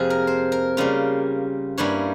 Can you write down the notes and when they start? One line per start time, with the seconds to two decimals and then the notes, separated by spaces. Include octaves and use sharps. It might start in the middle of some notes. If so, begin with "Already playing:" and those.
Already playing: F2 C3 F3 A#3 G#4
0.10 A#4
0.27 C5
0.52 A#4
0.77 C#3 G3 A#3 F4
1.77 G2 G3 A#3 C#4 E4 C#5